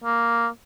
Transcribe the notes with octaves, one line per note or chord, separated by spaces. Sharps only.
A#3